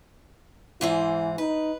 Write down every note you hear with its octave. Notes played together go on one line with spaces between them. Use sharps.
G#2 E3 E4 C5
D#4 B4